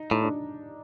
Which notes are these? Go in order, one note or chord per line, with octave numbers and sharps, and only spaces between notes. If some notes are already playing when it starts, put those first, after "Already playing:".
Already playing: D#4
A2 D#4
D4